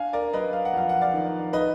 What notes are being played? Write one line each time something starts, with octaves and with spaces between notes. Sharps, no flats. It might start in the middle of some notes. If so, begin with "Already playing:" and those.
Already playing: D4 F5 G#5
A#4 D5
F#3 B4 D#5
F5
F#5
F2 F5
F#5
D5 F5
D#3
D#4 B4 D#5